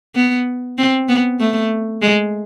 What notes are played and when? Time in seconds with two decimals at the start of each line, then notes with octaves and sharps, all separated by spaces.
0.15 B3
0.78 C4
1.09 B3
1.40 A3
2.02 G#3